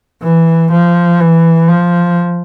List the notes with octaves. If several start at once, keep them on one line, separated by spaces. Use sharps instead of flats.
E3
F3
E3
F3